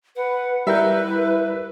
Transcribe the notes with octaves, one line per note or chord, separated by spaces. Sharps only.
B4 F#5
G3 E4 A#4 B4 E5 G6